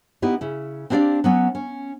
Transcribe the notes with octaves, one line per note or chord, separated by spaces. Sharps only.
B3 D#4 E4 G4
C#3 E4
C4 D4 E4 G4 D5 F5
F#3 B3 C#4
C#4